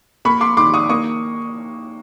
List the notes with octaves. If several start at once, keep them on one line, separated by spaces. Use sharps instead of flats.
A#3 B5 C#6
C6 D6
D#3 C6 D6
C#6 D#6
A#3 C#6 D#6